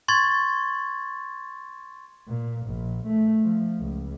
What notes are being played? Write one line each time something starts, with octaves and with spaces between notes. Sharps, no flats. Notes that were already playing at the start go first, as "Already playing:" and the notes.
C6 C#6 G#6 A6
A#2
A#1
A3
F3
C#2